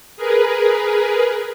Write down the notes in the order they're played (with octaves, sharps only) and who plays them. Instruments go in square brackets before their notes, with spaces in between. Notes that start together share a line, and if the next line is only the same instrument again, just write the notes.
[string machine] G#4 A#4 B4